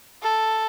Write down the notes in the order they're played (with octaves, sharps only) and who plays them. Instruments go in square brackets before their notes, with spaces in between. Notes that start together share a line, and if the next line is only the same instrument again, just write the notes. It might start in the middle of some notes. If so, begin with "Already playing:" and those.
[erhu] A4